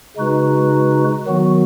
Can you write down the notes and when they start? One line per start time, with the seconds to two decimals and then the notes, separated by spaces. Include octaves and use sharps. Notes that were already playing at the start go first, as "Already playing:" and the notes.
0.17 C#3 G#3 D#4 F#4 B4
1.26 D#3 F#3 B3 F#4